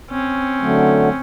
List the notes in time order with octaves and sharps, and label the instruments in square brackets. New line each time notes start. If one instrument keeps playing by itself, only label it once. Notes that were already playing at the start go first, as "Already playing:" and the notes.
[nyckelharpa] C4 C#4
[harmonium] D3 F#3 A3